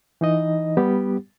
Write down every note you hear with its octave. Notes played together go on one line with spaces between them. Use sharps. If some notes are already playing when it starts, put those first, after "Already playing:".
E3 D#4 D#5
G3 B3 G4